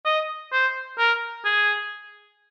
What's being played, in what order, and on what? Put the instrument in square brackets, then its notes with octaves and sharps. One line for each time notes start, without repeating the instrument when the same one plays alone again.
[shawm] D#5
C5
A#4
G#4